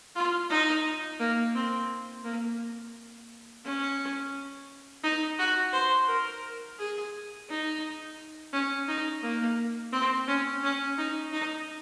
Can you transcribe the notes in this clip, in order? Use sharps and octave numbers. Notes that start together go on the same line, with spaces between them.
F4
D#4
A#3
C4
A#3
C#4
D#4
F#4
C5
A#4
G#4
D#4
C#4
D#4
A#3
C4
C#4
C#4
D#4
D#4